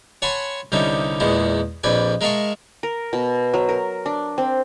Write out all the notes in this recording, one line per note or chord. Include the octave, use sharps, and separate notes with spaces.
C#5 F#5 G#5 A5 B5 C6
C2 D3 G3 C#4 D#4 E5
E2 A#2 G#3 B3 E4
A#1 F2 B4 D5 G#5
G#3 A#4 E5 F5 A5 C#6
A#4
B2
F#3
A#4
D4
C4